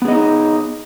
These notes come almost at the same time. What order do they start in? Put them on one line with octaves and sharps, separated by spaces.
B3 G#4 D#5 D#4